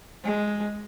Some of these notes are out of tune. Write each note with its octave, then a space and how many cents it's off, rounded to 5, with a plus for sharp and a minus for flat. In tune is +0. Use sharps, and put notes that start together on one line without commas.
G#3 +0